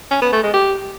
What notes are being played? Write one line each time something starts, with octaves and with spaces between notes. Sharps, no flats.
C#4
B3
A3
G#3
G4